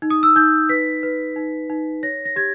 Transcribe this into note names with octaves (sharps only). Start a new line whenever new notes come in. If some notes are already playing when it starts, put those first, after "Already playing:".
D#4
D#6
E6
D#4 G6
B4 B6
B4
D#4
D#4
C#5 A#6
A#6
G4 G#6